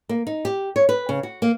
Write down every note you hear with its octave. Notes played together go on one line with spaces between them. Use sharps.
A#3
D#4
G4
C#5
B4
C#3
F#4
A#3